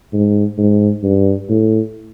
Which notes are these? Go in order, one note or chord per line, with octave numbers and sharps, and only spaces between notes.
G#2
G#2
G2
A2